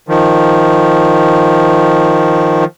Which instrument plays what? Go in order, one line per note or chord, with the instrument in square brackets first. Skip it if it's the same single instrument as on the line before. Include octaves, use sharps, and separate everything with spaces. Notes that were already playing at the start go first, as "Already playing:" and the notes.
[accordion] D#3 F3